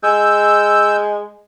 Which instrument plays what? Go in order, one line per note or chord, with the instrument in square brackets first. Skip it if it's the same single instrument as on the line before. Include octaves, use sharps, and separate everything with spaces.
[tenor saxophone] G#3 [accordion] E6 G6